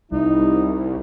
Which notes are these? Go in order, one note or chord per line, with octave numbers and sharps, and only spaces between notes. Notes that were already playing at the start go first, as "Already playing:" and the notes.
C2 G3 D#4 E4